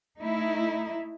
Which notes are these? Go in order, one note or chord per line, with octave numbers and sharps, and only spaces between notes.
A3 D#4 E4